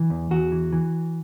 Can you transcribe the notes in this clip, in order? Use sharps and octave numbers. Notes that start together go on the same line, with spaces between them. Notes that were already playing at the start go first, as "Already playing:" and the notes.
Already playing: E3
E2
E2 F#4
E3
E3